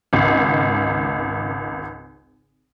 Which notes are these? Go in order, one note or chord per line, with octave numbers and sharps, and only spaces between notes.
G#1 C#2